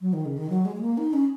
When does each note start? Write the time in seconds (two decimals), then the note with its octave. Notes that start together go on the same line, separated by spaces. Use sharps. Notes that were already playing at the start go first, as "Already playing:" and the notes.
0.01 F#3
0.13 D#3
0.26 C#3
0.38 D#3
0.50 F#3
0.65 G#3
0.76 G#3
0.81 A#3
0.98 D#4
1.13 C#4